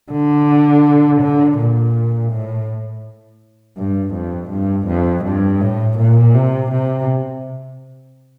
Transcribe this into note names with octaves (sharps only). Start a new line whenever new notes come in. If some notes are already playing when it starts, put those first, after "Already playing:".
D3
D3
A#2
A2
G2
F2
G2
F2
G2
A2
A#2
C3
C3